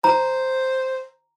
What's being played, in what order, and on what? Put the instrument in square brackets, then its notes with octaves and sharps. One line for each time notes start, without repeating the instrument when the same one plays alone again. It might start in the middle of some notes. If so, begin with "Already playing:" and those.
[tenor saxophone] C5 [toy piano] A#5